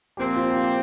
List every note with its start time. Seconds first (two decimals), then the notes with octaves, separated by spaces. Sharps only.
0.17 A#2 F3 C4 G4
0.36 F4
0.50 G4
0.54 F4